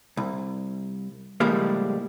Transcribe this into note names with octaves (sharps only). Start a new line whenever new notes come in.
C2
A2 C#3 F3 G3 G#3 A#3